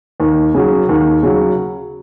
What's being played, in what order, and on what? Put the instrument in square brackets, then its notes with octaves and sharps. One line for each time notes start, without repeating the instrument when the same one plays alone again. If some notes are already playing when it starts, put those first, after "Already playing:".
[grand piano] D#2
C#3 F#3
D#2
C#3 F#3